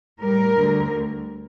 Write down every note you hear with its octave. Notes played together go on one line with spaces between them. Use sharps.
A2 G3 A#4
D2 D3 G3